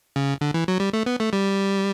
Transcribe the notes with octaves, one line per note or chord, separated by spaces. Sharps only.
C#3
D3
E3
F#3
G3
A3
B3
A3
G3